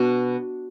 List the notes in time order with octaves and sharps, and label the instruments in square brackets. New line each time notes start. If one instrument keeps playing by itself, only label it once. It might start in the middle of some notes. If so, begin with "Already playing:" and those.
Already playing: [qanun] B2 D4